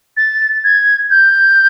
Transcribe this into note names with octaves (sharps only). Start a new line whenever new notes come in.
A6
G#6
G6